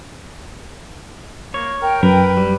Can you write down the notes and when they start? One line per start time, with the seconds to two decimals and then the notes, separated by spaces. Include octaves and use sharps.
1.54 A#3 C#5
1.82 A#4 G5
2.03 F#2 A#4 B4
2.37 G3